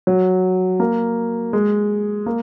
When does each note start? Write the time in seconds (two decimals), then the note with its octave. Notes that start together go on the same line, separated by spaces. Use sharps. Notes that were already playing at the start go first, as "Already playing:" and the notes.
0.07 F#3
0.80 A#3
1.53 G#3
2.26 A#3